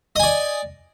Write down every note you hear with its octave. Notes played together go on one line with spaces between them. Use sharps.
D5 D#5 G#5